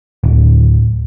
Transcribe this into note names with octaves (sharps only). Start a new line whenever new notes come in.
D1